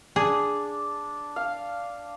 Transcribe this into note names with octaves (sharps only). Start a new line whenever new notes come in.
D4 G#4
F5